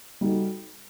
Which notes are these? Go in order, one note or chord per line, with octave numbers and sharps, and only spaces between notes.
G3 D#4 F#4 A4